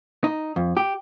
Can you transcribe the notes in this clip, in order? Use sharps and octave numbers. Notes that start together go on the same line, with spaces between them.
D#4
F2
G4